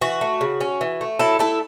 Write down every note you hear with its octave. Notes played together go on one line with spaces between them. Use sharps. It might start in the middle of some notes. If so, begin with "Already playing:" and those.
E3 F#4
A3
C#3
C#4
E3
A3
F#3 E4 A4
A3 E4 A4